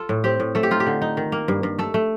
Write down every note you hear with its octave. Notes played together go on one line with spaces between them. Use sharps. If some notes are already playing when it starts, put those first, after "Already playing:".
Already playing: F4 A4
A2
C4 G4
A2
A3 A4
G4
D#4 F4
G4
D3
D#4
D#3
A#3
G2
G2
A3 A4
A3